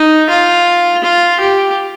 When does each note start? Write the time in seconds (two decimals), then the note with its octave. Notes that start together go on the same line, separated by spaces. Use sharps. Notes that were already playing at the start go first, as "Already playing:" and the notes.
Already playing: D#4
0.30 F4
1.04 F4
1.41 G4